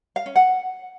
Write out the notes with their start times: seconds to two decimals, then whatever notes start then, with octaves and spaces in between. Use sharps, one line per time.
0.16 F5
0.26 C#4
0.36 F#5